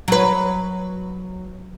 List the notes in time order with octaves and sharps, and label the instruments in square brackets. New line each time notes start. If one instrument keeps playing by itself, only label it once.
[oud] F#3 B4